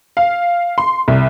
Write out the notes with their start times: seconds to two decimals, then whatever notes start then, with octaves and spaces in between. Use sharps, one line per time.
0.17 F5
0.78 C6
1.08 C2